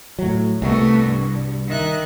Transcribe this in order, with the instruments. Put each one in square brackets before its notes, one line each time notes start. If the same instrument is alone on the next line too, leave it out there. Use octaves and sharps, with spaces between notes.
[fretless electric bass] A2 F#3
[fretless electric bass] C2 [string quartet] A3 B3 F#4
[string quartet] G2
D#3 E5 F#6